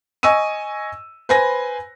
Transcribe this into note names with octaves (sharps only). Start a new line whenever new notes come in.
D#5 G#5 C#6 E6 D#7
B4 C5 G#5 B5 A#6